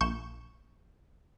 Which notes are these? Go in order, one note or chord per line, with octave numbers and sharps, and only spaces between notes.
A#1 C#6 G6 E7